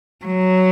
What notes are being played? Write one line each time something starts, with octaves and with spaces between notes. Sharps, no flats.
F#3